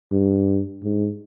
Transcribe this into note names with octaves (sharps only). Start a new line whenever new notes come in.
G2
G#2